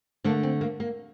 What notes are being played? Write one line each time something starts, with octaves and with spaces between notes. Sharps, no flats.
D3 A3 A#3 D4
C4
A#3
A#3